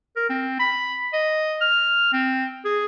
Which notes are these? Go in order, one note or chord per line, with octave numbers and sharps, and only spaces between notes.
A#4
C4
B5
D#5
F6
C4
G#4